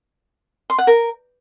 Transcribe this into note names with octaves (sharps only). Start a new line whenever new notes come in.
C6
F#5
A#4